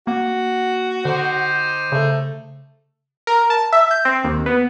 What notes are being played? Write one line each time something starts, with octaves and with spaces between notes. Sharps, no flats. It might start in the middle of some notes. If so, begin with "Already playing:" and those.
A#3 F#4
D3 D#4 G4 C5
C#3 A3
A#4
A5
E5
G6
C4
D#2
B3